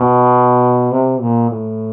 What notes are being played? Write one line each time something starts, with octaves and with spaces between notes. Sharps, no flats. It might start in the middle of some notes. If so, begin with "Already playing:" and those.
Already playing: B2
C3
A#2
A2